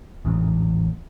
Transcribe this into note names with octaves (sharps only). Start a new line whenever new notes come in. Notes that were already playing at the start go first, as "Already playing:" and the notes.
A1 E2 G#2